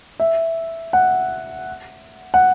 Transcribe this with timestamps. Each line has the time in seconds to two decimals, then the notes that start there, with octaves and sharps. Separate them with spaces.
0.20 E5
0.93 F#5
2.34 F#5